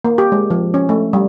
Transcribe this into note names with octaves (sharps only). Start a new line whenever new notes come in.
A#3
G4
G#3
F3
C#4
A3
G3